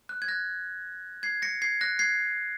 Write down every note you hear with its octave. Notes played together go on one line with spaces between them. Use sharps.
F#6
G#6
F#6 A#6
G#6 C7
A#6 C#7
G#6 C7
F#6 A#6
G#6 C7